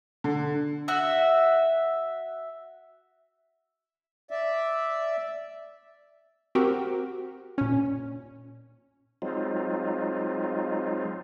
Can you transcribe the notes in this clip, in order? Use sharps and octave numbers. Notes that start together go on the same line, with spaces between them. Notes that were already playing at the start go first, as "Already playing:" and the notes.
D3
F#4 E5
D5 E5
C4 F#4 G4 A#4
A#2 C#4
F#3 G#3 C4 D#4 F4